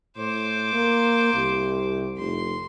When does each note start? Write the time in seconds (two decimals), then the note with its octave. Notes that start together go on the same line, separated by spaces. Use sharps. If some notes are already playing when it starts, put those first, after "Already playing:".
0.17 A2 C5 D6
0.73 A#3
1.34 C2
2.18 F1 C6